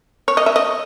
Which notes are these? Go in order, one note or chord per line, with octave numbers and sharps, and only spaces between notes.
C#5
D#5
E5
D#5